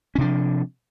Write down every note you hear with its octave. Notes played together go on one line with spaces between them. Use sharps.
C3 F3 C#4 D4